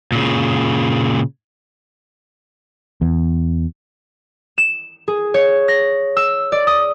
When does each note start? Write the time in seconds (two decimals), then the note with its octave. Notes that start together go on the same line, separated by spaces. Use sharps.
0.12 A#2 C#3
3.01 E2
4.58 E7
5.08 G#4
5.34 C#5
5.68 A#6
6.17 E6
6.52 D5
6.67 D#6